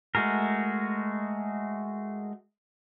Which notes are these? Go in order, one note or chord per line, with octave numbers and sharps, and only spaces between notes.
G#3 A3 F#4 G#4 A#4